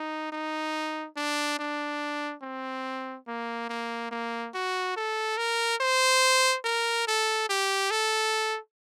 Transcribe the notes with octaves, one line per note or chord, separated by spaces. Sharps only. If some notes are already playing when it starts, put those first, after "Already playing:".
Already playing: D#4
D#4
D4
D4
C4
A#3
A#3
A#3
F#4
A4
A#4
C5
A#4
A4
G4
A4